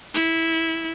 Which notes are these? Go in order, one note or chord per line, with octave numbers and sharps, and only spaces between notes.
E4